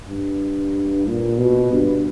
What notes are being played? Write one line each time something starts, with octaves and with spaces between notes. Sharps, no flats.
G2
A#2
B2
G2